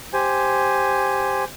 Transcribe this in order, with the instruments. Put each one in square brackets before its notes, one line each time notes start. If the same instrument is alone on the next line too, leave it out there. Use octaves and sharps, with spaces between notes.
[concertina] G4 C5 G#5